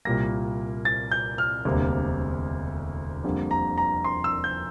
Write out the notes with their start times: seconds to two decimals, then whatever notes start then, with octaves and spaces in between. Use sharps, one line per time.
0.05 C2 A#2 G3 A#3 A#6
0.85 A6
1.12 G6
1.38 F6
1.65 E1 D2 C3 G3 A#3
3.24 F2 D3 G3 A#3
3.51 A#5
3.78 A#5
4.04 C6
4.24 E6
4.44 G6